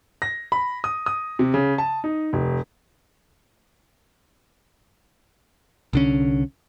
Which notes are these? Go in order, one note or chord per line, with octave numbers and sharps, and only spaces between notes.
A#6
B5
D#6
D#6
C3
C#3
A5
D#4
F1
C2 D3 C#4